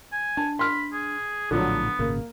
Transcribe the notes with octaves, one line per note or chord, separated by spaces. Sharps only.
G#5
D4 A5
B5 C6 F6
G#4
A#1 A2 D3 F3 F#3 B3
G#1 A#2 C#3 A#3